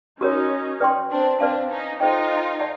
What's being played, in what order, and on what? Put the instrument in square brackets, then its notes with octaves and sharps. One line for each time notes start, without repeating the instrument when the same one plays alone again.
[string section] C#4 D#4 [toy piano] F#4 A#4 C#5
[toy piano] B4 D5 G5 C6
[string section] C4 D4
[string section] C4 D4 [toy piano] B4 D5 F5 A5
[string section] C#4 D#4
[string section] D#4 F4 [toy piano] A4 C5 D#5 G5
[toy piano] D5 F#5 A5